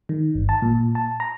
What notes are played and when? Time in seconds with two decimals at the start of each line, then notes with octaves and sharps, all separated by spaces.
0.09 D#3
0.35 G1
0.49 A5
0.62 A#2
0.95 A5
1.20 A#5